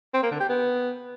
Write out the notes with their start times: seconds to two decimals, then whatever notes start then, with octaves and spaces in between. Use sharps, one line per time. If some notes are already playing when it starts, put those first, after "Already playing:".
0.14 C4
0.23 A#3
0.31 D3
0.40 G4
0.49 B3